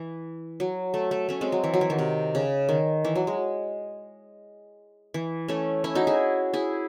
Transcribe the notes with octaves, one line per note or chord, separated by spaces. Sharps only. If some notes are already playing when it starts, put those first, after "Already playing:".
Already playing: E3
F#3
A3
A3
A3 C#4
G#3 C4
F#3
E3
F#3
E3
D#3
C3
C#3
D#3
E3
F#3
G#3
E3
A3 C#4
C#4 E4
D#4 F#4
E4 G#4
E4 G#4